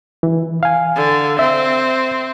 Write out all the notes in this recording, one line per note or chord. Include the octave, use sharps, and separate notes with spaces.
E3
F5 G#5
D3
C4 E5